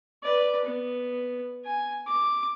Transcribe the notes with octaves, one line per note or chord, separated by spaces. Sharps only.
B4 D5
B3
G#5
D6